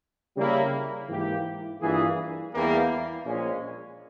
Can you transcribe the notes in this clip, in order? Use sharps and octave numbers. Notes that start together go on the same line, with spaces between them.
C#3 G3 A#3 E4
G#2 E3 A#3 E4 G4
G2 E3 A#3 F4 G#4
E2 E3 G3 A#3
A#1 A#2 G#3 C#4